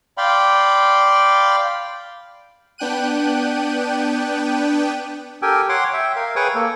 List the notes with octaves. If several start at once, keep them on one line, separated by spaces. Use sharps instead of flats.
D5 F5 G5 B5 C6
B3 D4 G5 F#6 D#7
G4 A4 A#4 G5 G#5
C#5 F#5 G5 C6 D6
E5 G5
A#4 F5
G#4 B4 C#5 G5 C#6 D#6
A#3 A4